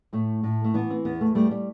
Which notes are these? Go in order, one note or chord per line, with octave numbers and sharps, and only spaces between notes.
A2 A3
A2
A3
E3 B3
C4
E2 B3
A3
G3 A3
G3